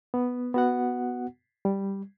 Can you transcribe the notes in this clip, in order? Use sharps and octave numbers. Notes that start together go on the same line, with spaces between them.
B3
B3 F#4 F#5
G3